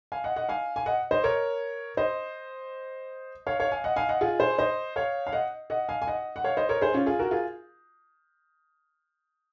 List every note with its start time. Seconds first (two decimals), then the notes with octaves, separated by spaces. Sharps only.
0.12 F5 G#5
0.24 D#5 F#5
0.36 D#5 F#5
0.49 F5 G#5
0.76 G#5
0.86 D#5 F#5
1.11 C5 D#5
1.24 A#4 C#5
1.97 C5 D#5
3.47 C#5 F5
3.60 C#5 F5
3.71 F5 G#5
3.84 D#5 F#5
3.96 F5 G#5
4.09 D#5 F#5
4.21 F4 G#4
4.40 G#4 C5
4.58 C5 D#5
4.96 C#5 F5
5.27 F5
5.32 D#5 F#5
5.70 D#5 F#5
5.89 F5 G#5
6.02 G#5
6.08 D#5 F#5
6.36 F#5
6.44 C#5 F5
6.57 C5 D#5
6.69 A#4 C#5
6.81 G#4 C5
6.94 C#4 F4
7.06 F4 G#4
7.19 F#4 A#4
7.31 F4 G#4